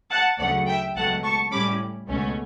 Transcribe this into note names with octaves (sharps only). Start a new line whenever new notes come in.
F#5 A5
D2 C#3 F#3 A3 D5 F#5
E5 G5
C#2 B2 F#3 A3 F#5 A5
A5 C#6
A2 G3 C#4 B5 D6
C#2 B2 A3 C#4